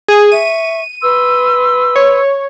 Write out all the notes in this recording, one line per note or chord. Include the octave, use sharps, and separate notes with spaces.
G#4
E5 C#6 D#7
B4 C6 E6
C#5